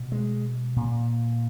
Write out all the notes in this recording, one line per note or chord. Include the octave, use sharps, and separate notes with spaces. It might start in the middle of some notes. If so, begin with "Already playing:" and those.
Already playing: B2
G#3
A#2